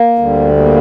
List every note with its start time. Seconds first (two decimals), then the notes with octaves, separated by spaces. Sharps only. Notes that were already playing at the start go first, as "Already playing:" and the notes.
Already playing: A#3
0.18 D2 D3 G3
0.57 A#3